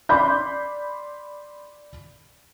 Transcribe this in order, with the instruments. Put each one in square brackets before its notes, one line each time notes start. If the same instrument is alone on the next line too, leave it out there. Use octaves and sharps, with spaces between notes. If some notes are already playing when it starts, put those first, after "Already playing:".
[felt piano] D5 B5 C6 G6